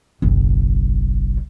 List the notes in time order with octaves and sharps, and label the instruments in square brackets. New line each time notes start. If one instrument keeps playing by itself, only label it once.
[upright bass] F#1 B1